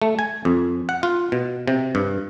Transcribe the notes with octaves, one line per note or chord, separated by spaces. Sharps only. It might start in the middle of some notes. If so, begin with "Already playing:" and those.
A3
G#5
F2
F#5
F4
B2
C3
G2